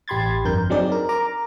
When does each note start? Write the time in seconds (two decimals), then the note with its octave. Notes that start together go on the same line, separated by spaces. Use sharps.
0.08 A1 G4 B5 C6 G#6 A6
0.45 G1 F2 D3 A#4 G6
0.70 F#3 C4 D4 D#4 G#4 D5
0.92 A#4
1.09 A#4 A#5 D6